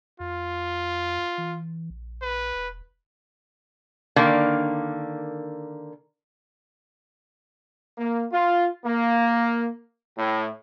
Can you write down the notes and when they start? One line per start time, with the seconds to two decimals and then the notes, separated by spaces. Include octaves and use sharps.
0.20 F2 F4
1.38 E3
1.90 A#1
2.22 B4
2.55 E1
4.16 D3 D#3 A#3
7.98 A#3
8.33 F4
8.85 A#3
10.18 A2